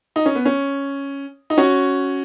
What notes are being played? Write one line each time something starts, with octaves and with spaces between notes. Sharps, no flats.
D#4
C#4
B3
C#4
D#4
C#4 F#4